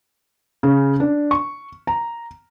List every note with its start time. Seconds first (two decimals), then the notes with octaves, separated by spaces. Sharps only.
0.63 C#3
1.00 D4
1.31 C#6
1.87 A#5